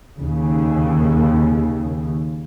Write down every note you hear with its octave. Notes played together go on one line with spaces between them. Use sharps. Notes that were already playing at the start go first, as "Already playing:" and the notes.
D#2 C#3